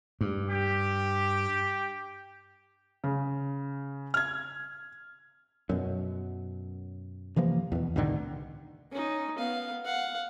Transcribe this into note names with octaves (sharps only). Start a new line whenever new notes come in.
G2
G4
C#3
F6 G#6
F#2 B2
C3 E3 F3 A#3
E2 B2
C2 A2 D3 D#3
C#4 D#4
B3 F5
F5 F#5